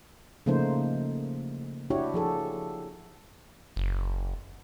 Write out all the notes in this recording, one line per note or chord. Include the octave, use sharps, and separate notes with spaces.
C#3 F3 A3 A#3 D#4 C5
D4 E4 F#4 G4 C#5
F3 G#4 A4
F#1